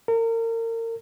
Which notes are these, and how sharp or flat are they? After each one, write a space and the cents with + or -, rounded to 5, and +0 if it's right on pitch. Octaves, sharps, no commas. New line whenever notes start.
A#4 -35